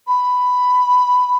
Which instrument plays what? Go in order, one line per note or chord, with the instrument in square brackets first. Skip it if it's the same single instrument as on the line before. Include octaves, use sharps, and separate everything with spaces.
[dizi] B5